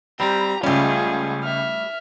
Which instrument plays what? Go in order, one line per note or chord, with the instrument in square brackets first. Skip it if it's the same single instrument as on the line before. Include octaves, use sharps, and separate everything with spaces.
[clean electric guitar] G3 C4 [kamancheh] G4 A#5 [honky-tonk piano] B5
[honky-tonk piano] C#2 C#4 [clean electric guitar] G3 A3 [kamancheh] F4 G#4
[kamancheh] E5 F6